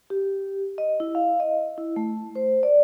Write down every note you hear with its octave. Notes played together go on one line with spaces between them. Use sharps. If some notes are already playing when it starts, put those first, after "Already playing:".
G4
D#5
E4
F5
D#5
E4
A3
C5
D5